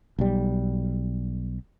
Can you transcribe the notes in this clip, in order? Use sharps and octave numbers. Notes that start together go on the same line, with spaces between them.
B1 G3